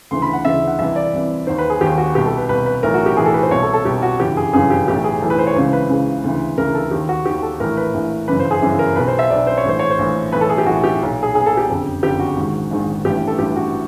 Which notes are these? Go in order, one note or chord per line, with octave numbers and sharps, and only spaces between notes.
D2 C#3 E3 C6
B5
F#5
D2 C#3 E3 E5
F#5
C2 C3 E3 E5
D5
C2 C3 E3
D#2 D#3 C5
B4
G#4
D#2 D#3 G4
F#4
C2 B2 G4
A4
B4
C2 B2 B4
B4
B1 A2 E3 A#4
F#4
G4
B1 A2 E3 G#4
A4
B4
C5
C2 B2 C#5
A4
A4
C2 B2 G4
F#4
G1 F#2 C#3 E3 G4
G#4
G1 F#2 C#3 E3 G#4
G4
B1 A2 E3 G4
G#4
B1 A2 E3 A4
B4
C5
C#5
C#2 C#3 E3 C5
B4
C#2 C#3 E3
D2 C#3 E3
D2 C#3 E3 A#4
A4
D#2 D#3 G4
F#4
D#2 D#3 G4
A4
A#1 A2 E3 A#4
B4
A#1 A2 E3
G1 F#2 C#3 E3 B4
C5
G#4
G1 F#2 C#3 E3
A#4
B1 B2 B4
C5
E5
B1 B2 D5
C5
C#5
A#1 A2 E3 C5
C#5
C5
A#1 A2 E3
B1 A2 E3 B4
A4
G#4
G4
B1 A2 E3 F#4
G4
B1 A#2
G#4
B1 A#2 G#4
A4
G4
F#1 F2 D3
F#1 F2 D3 G4
F#4
A#1 G#2 D#3
A#1 G#2 D#3
A1 G2 E3 G4
A4
A1 G2 E3 G4
F#4